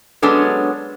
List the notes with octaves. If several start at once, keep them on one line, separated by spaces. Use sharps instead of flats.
F#3 G#3 B3 C#4 D4 A4